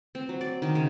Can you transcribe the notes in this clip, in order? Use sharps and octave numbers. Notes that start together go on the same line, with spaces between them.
C4
F#3
D5
D#3
C#3